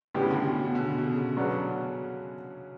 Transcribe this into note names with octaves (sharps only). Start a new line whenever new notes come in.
A2 C#3 G3 B3 E4 G4
D3
B2
B2
D3
B2
C#3
C#3 F#3 B3 D4